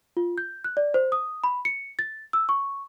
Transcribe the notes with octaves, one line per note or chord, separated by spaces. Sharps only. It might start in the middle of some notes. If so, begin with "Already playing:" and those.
F4
G6
F#6
D5
C5
D#6
B5
C#7
A6
E6
C#6